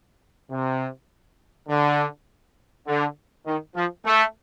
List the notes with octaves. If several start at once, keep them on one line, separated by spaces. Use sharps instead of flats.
C3
D3
D3
D#3
F3
A3